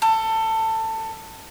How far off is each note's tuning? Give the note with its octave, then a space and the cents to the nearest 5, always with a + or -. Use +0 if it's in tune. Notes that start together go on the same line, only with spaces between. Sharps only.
A4 +20